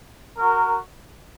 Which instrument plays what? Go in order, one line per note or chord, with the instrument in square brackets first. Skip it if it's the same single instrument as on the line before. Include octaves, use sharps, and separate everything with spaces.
[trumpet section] F#4 A#4